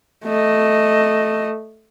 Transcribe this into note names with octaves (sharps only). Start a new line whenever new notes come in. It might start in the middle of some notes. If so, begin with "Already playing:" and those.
A3 D#5